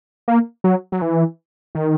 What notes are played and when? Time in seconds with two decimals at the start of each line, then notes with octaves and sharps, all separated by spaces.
0.28 A#3
0.64 F#3
0.92 F#3
1.02 E3
1.75 D#3